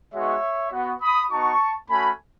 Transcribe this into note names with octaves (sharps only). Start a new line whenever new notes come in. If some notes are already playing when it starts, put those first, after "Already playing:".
G#3 B3 D#4 F#4 C#5 E5
B3 F#4
B5 D#6
B3 D#4 F#4 A5 C#6
A3 C#4 F#4 G#5 B5